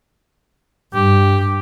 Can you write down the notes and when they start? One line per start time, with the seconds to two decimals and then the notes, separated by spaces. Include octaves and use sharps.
0.94 G2 G4